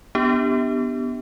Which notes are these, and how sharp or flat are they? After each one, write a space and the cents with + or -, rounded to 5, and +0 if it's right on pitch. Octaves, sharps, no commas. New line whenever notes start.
B3 +0 D4 +0 G4 +0